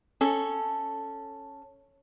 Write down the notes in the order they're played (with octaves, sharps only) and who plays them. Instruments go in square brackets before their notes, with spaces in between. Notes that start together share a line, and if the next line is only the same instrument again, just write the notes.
[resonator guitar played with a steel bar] C#4 A4